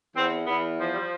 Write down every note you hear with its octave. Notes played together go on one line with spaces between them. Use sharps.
E2 C4
E2 B3
F3
G3